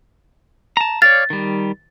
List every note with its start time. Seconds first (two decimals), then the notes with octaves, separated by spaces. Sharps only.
0.77 A5 A#5
1.02 C#5 D5 F5 A6
1.30 D#3 G3